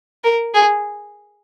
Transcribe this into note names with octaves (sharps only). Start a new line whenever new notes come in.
A#4
G#4